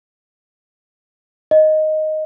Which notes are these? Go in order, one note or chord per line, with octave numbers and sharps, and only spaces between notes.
D#5